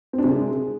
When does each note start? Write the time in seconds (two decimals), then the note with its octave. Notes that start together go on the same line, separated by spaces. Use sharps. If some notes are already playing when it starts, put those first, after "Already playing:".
0.13 C4
0.18 D4
0.24 C3
0.29 G#3